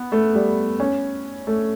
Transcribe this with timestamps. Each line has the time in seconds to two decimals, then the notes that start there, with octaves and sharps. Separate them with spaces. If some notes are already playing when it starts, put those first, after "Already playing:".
Already playing: B3
0.12 A3
0.35 G3
0.80 C#4
1.47 A3